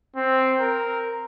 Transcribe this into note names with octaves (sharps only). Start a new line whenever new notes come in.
C4
A#4